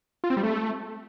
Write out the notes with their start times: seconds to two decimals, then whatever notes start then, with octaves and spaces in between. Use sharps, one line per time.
0.24 F4
0.30 C4
0.37 G3
0.43 A3